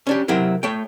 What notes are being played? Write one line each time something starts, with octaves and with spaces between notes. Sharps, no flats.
C#4 D4 G4
C3 F#3 C4 E4 A#4
A3 C#5 G5